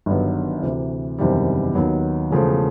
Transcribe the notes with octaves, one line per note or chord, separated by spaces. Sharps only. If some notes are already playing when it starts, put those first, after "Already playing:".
G1 G2 D#3 F#3 B3
D2 C3 E3
F#1 E2 C3 D#3 G3
D#2 D#3 F#3 B3
E1 E2 C#3 F3 A3